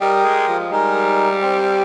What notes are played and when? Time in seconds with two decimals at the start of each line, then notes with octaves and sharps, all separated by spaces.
0.01 G3 G4 A#4 D#5 G5
0.25 G#3
0.48 F3
0.71 G3 G#3 D#4 A#4
1.43 C4 G4 C5 G5